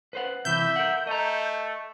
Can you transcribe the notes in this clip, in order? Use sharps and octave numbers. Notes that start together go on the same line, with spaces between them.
B4 C5 F#5
C3 E3 E5 G6
A#4 F#5
A3 D#5 A#5